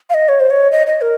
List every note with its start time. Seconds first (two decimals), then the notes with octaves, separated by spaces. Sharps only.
0.10 F5
0.14 D#5
0.29 C#5
0.40 C5
0.50 C#5
0.72 D#5
0.87 D#5
1.01 A#4